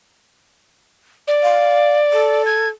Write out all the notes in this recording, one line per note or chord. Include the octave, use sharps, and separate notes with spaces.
D5
F5
A4
G#6